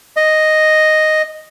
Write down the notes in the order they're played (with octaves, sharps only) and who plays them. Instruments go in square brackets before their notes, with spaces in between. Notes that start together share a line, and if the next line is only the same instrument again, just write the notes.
[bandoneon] D#5